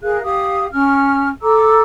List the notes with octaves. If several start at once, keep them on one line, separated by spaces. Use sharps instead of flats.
G#4 A#4 F5 F#6
G4 F5 D#6
C#4 F6
A4 A#5 D6 E6